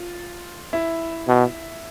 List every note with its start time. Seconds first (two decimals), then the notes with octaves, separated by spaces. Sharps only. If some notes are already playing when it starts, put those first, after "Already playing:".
Already playing: F4
0.73 E4
1.28 B2